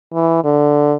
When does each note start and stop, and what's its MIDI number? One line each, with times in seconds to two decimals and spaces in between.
0.13 0.39 52
0.44 0.95 50